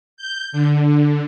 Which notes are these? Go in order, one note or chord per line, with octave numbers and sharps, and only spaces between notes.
G6
D3